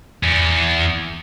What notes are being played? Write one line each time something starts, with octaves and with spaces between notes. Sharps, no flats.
E2